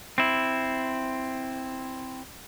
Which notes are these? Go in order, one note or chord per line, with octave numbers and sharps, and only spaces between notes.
C4 E4